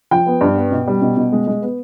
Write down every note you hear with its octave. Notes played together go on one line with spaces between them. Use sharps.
F3 G5
B3
G2
B3
B2
G3
B2
B2
G#3
G#3
B3